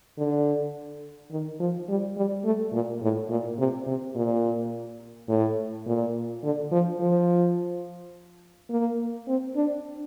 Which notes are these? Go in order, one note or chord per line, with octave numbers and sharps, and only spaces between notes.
D3
D#3
F3
G3
G3
A3
A#2
A2
A#2
C3
C3
A#2
A2
A#2
D3
F3
F3
A#3
C4
D4